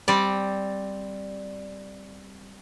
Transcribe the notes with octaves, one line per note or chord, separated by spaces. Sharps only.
G3 C4 D5